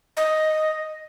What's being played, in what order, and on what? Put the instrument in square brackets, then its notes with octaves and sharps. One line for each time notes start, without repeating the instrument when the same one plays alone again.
[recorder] D#5